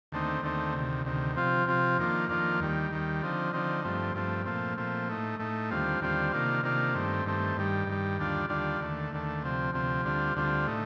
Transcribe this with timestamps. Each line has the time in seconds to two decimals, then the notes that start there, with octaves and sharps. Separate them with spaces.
0.12 D#2 D3 A3 C4 D#4
0.42 D#2 D3 A3 C4 D#4
0.74 D2 C3 D#3
1.05 D2 C3 D#3
1.36 C3 F3 C4 F4
1.66 C3 F3 C4 F4
1.98 F2 D#3 A#3 D4 F4
2.29 F2 D#3 A#3 D4 F4
2.60 D#2 D#3 G3
2.91 D#2 D#3 G3
3.22 D3 F3 C4 D#4
3.53 D3 F3 C4 D#4
3.84 G2 F3 A3 C4
4.15 G2 F3 A3 C4
4.46 A#2 F3 A3 C4
4.78 A#2 F3 A3 C4
5.09 A2 A3 D#4
5.40 A2 A3 D#4
5.71 D#2 D3 G3 C4 F4
6.01 D#2 D3 G3 C4 F4
6.32 C3 D#3 A#3 D4 F4
6.63 C3 D#3 A#3 D4 F4
6.94 G2 D#3 A3 C4
7.25 G2 D#3 A3 C4
7.57 G2 D#3 G3
7.87 G2 D#3 G3
8.19 D#2 D3 G3 D4 F4
8.49 D#2 D3 G3 D4 F4
8.80 D#2 D3 A3
9.12 D#2 D3 A3
9.43 D2 C3 F3 C4
9.73 D2 C3 F3 C4
10.05 D2 D3 G3 C4 F4
10.36 D2 D3 G3 C4 F4
10.67 A2 A3 D#4